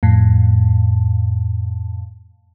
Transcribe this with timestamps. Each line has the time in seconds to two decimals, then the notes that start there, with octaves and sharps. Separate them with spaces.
0.03 F2 A2